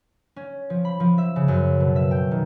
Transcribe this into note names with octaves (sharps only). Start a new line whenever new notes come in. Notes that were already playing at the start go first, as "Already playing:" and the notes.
C#4
F3
B5
F3
E5
C#3
F#2
B2
E5
G5
D#3